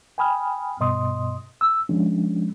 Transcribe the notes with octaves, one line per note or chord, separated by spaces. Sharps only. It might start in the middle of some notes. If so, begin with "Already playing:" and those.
G5 G#5 B5 D#6 F6
G2 B2 D#5 C6 D#6
E6
F3 G#3 C#4 D4